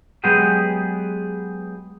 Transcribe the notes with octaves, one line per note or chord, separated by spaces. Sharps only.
F#3 G#3 B3 G4 G#4